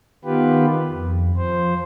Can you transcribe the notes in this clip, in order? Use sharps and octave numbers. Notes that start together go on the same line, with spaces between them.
D#3 B3 F4 G4 B4
F2
F3 C5